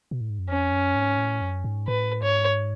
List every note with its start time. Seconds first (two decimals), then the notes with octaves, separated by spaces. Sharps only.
0.11 B2
0.21 A2
0.30 G#2
0.39 F#2
0.48 F2 C#4
0.72 F#2
0.95 G#2
1.18 A2
1.42 F#2
1.64 G#2
1.88 A2 B4
2.22 G#2 C#5